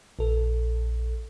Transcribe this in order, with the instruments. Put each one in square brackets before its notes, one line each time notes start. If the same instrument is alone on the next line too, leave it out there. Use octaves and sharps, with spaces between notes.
[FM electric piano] A#1 A4